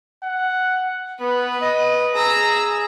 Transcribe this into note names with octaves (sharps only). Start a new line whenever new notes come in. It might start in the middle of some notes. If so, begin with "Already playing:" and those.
F#5
B3 B4
D#5
G#4 A#5 E6